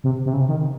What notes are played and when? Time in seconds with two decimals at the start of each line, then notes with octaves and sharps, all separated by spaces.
0.04 C3
0.26 C3
0.33 C#3
0.40 C3
0.49 D#3